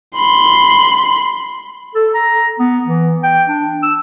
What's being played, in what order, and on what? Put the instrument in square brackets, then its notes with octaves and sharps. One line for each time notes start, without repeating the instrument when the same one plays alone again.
[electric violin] B5 C6
[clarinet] A4
A#5
B3
E3
G5
D4
E6